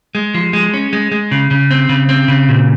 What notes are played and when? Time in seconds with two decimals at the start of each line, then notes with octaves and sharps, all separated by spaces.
0.15 G#3
0.34 F3
0.53 G#3
0.74 C#4
0.93 G#3
1.12 G#3
1.31 C#3
1.51 C#3
1.71 C4
1.89 C#3
2.09 C4
2.28 C#3
2.48 A#2